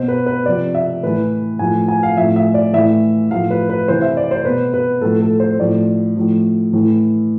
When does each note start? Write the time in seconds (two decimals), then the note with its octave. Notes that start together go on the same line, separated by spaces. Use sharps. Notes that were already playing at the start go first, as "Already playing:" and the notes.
Already playing: B2 C5
0.08 B4
0.26 B4
0.46 C3 F3 D5
0.75 E5
1.03 A2 E3 B4
1.59 A2 F3 G#5
1.88 G#5
2.03 F5
2.17 A2 F3 E5
2.36 E5
2.54 D5
2.73 A2 E3 E5
3.31 A2 F3 F5
3.50 B4
3.69 B4
3.88 C3 E3 C5
4.02 E5
4.17 D5
4.31 C5
4.45 B2 B4
4.74 B4
5.01 A2 F3 A4
5.21 A4
5.40 C5
5.59 A2 F3 D5
6.16 A2 F3
6.73 A2 E3